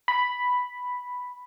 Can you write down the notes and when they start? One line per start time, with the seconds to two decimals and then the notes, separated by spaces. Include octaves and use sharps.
0.08 B5